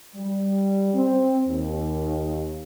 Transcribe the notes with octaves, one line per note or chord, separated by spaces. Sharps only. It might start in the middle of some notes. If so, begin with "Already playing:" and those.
G3
C4
D#2